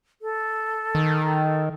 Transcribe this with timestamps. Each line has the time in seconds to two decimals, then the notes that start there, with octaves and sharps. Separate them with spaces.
0.22 A4
0.95 D#3